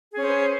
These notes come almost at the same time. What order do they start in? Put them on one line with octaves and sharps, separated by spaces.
G#4 C#4 C5 B4